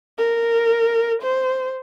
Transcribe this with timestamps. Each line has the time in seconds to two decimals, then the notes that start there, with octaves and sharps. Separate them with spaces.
0.18 A#4
1.22 C5